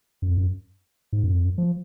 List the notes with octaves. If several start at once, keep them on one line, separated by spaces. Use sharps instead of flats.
F#2
F2
F#2
G#2
F#2
F2
F#2
F3